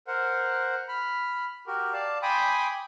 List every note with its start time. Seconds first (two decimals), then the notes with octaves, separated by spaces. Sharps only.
0.07 A#4 C5 F#5
0.89 B5 F6
1.67 F#4 G4 A#4
1.93 D5 F5 A5
2.22 G5 G#5 B5 C6 D6 D#6